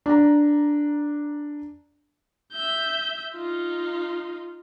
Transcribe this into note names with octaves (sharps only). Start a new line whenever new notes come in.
D4 A#5
E5 G6
D#4 F4